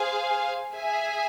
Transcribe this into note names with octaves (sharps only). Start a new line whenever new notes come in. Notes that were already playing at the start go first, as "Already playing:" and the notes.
Already playing: G#4 C5 F5 G#5
G#4 E5 G#5